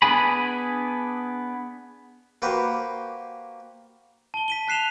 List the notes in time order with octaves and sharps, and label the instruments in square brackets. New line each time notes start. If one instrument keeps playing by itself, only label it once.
[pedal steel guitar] B3 D4 G#4 G#5 B5
[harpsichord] A#3 F#4 G4 B4 C5
[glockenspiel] A5 G7
B6 D#7 G7
A5 F#6 C7 E7 F7